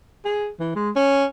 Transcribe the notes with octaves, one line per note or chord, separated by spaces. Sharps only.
G#4
E3
G#3
C#4